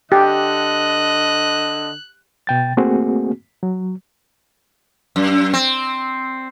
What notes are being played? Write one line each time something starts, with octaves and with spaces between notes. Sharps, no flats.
D3 G4 D#5 F#6
B2 G5 A6
A3 A#3 C4 F#4 G#4
F#3
F#2
C4